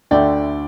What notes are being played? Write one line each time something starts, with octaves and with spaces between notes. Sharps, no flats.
D2 D3 A3 D5 G5